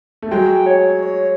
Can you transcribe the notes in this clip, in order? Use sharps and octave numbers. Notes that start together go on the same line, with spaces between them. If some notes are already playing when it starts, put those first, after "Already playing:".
A3
F#3 G#3 G5
C#5
C#5